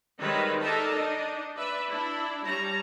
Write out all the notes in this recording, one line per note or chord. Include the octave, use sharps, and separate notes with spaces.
D#3 G3 G#3 C4 B4 C#5
D4 D#4 A4 A#4 E5 A5
D4 D#4 D#5
B4 D5 E5
D4 E4
G3 C#5 A5 A#5